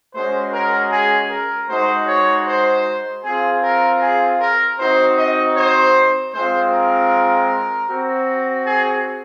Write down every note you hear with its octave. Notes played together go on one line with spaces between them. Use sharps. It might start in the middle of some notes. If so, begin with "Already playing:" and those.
G#3 C#4 F#4 C5
A#4
G#4
A#4
G#3 D#4 F#4 C5
C#5
C5
C4 F4 G#4
A#4
G#4
A#4
C4 D#4 F#4 C5
D#5
C5
G#3 C4 F4 C5
A#4
C4 F#4
G#4